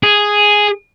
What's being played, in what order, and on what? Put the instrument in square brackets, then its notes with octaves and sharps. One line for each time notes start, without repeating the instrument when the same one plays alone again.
[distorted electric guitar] G#4